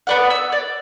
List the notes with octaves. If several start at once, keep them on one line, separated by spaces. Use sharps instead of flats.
B3 D5 F#5
E6
D5